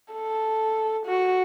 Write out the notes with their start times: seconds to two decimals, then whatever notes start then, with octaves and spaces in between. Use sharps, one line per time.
0.13 A4
1.06 F#4